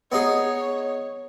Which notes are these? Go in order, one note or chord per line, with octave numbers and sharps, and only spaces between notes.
B3 D#4 G#4 C#5